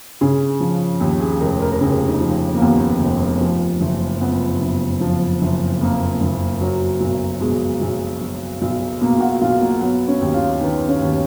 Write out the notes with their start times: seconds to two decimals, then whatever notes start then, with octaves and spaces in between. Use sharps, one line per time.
0.21 C#3 G#4
0.60 F3
1.00 D#2
1.21 G#4
1.40 F1 A#4
1.61 A#4
1.72 A#4
1.81 C#3 G#4
2.08 D#4
2.21 F3
2.55 A#3
2.60 D#2 B3
3.01 F1
3.41 F3
3.81 F#1
4.21 F2 B3
4.61 F#1
5.01 F3
5.42 F#1
5.81 F2 A#3
6.21 F#1
6.61 F#3
7.00 B1
7.40 B2 G#3
7.81 B1
8.21 F#3
8.62 B1
9.01 B2 A#3
9.15 F4
9.20 F#4
9.41 B1 F4
9.61 A#3
9.81 F#3 B3
10.08 C#4
10.21 D#2
10.34 F4
10.60 D#3 B4
10.88 C#4
11.01 D#2